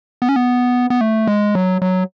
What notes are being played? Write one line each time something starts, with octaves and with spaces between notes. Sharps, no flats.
B3
C#4
B3
B3
A3
G#3
F#3
F#3